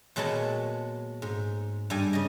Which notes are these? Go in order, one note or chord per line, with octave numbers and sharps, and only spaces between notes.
A#2 F#3 G#3 B3 C#5 A5
G#2
G2 G3 G#5
C#3 D#5